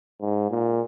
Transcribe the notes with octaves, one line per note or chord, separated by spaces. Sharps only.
G#2
A#2